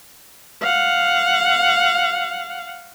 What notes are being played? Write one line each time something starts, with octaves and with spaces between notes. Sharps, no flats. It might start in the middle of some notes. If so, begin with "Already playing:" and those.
F5 F#5